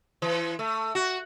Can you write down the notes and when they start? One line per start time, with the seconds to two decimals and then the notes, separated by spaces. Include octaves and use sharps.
0.22 E3
0.59 A3
0.95 F#4